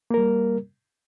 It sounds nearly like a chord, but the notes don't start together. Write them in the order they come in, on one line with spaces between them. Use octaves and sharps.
A#3 A#4 G3